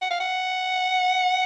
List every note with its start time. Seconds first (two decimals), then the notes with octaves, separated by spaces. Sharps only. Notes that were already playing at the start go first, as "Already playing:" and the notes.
0.02 F#5
0.11 F5
0.20 F#5